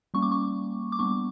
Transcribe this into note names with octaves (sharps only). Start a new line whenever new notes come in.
G3 A#3 C#4 C#6
D6
C#6
D6
G3 B3 D4 C#6